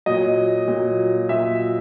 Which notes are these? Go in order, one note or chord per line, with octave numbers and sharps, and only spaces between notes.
A#2 F#3 D#5
A#2 F#3
A#2 F#3 E5